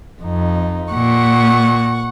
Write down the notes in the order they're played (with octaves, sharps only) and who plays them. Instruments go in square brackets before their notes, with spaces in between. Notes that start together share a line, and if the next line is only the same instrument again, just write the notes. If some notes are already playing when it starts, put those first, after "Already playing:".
[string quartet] F2 D#4
[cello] A#2 [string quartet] F#5 C#6